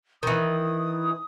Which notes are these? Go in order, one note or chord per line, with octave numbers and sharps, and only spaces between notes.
D#3 E3 D#6